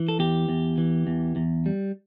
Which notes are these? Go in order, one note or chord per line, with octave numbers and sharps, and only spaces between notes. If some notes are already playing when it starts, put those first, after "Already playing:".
Already playing: E3
A4
E2 G4
E2
E3
E2
E2
G3